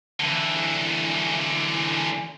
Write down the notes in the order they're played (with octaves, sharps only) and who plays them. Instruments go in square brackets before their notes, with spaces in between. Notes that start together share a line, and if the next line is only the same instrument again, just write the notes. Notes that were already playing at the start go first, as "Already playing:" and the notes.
[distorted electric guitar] D3 E3